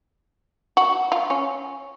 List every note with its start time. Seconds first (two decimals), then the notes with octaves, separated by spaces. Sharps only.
0.77 F#4
1.12 F4
1.30 C#4